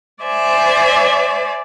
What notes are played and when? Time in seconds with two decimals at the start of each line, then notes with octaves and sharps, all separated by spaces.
0.23 C5 D5 E5 G#5